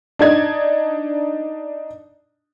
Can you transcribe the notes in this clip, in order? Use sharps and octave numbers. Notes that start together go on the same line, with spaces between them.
D4 D#4 G#6